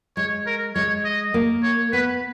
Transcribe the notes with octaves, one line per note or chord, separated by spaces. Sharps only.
G#3 C#5
A#4
G#3 C#5
D#5
A#3
C#5
B3 B4